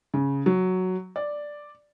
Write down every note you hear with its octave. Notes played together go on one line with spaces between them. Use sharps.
C#3
F#3
D5